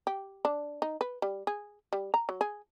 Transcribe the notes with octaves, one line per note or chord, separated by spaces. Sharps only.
G4
D4
D#4
B4
G3
G#4
G3
A#5
F#3
G#4